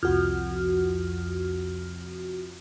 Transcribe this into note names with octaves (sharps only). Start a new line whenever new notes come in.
C2 F2 F#4 F6